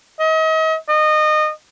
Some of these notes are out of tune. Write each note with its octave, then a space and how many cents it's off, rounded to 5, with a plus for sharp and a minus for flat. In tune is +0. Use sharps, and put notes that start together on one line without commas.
D#5 +40
D#5 -25